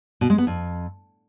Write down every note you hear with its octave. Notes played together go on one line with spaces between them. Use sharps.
B2
G#3
B3
F2